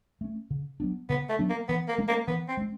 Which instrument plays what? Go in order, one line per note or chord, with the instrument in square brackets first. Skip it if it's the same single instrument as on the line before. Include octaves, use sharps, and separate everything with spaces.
[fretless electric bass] A3 C#4
C#3
F#3 B3 D4
[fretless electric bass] C#3 [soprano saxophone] B3
[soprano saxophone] A3
[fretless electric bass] F#3 B3 D4
[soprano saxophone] A#3
[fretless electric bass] E3 [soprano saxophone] B3
[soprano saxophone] A#3
[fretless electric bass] G#3 C#4
[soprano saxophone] A#3
[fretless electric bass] E3 [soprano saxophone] B3
[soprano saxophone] C4
[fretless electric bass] G#3 C#4